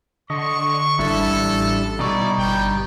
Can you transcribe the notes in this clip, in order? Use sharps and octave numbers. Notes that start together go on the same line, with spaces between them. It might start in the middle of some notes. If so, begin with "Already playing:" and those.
D3 D#5 C#6
G#1 G3 D4 E4 A4
A1
B2 G3 D#4 E4 D5 C#6
G1 B3 G5